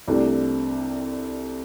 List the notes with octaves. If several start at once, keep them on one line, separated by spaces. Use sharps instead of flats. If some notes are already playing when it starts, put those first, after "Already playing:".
C2 C3 A3 D4 G4